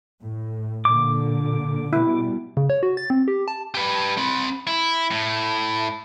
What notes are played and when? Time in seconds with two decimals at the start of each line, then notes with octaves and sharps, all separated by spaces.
0.20 A2
0.85 A#2 D3 D6
1.93 B2 G3 E4
2.57 C#3
2.70 C#5
2.83 F#4
2.97 A6
3.10 C4
3.28 G4
3.48 A5
3.75 G4 B4
4.17 C4 B5
4.67 E4
5.11 A2